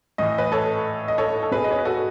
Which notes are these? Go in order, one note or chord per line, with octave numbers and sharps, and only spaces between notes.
A2 E3 D#5
B4 D#5
A4 C#5
D#5
A4 C#5
A4
B2 G#4 B4
D#5
C#5
B4
F#4 A4